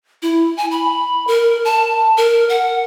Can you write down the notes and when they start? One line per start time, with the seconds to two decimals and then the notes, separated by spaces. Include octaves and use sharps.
0.22 E4
0.57 G#5
0.71 B5
1.27 A#4
1.65 A5
2.17 A#4
2.49 F#5